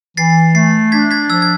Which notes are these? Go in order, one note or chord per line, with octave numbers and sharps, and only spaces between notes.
E3 A6 C7
A3 A6 C7
D4 G#6 B6
G#6 B6
F3 E6 G#6
G#6